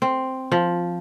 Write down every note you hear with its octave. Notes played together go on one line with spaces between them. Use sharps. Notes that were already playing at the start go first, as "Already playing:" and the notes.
C4
F3